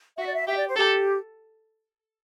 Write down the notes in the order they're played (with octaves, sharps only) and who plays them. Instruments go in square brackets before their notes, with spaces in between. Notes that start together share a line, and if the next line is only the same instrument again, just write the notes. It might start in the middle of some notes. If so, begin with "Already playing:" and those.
[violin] F#4 [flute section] E5
[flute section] D5
E5
[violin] G4 [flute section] E5
[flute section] D5
C5
[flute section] G4 [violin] A4